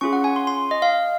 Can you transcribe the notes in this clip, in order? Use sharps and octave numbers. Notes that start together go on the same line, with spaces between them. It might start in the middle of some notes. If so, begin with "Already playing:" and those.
C#4 F4 G#4 C#6
F#5
G#5
C6
C6
D#5
F5